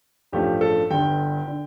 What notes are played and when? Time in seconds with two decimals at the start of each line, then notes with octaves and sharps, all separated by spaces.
0.32 A1 G2 F3 A3 G4
0.61 A4
0.91 G1 G2 D3 G5
1.48 D3